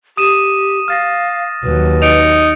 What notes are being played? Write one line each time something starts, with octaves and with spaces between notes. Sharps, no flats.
G4 D#6 D#7 E7
F5 F6 A6 A#6
D#2 F#3 B4
D#4 C#7 D7 F7